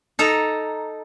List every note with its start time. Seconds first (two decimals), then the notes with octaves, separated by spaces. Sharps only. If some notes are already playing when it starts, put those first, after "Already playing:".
0.19 D#4 A4 A#5